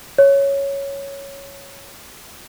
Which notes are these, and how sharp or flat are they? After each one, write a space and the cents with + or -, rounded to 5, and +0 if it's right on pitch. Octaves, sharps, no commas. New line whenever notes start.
C#5 +0